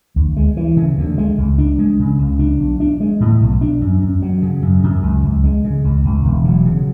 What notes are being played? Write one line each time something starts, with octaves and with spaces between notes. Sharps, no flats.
D2
G#3
E3
C#3
D2
G#3
C#2
D4
G#3
C#3
C#2
D4
B1
D4
G#3
A2
B1
D4
F#2
F#2
F#3
C#3
F#2
F#2
C#2
C#2
G#3
C#3
C#2
C#2
E1
F#3
C#3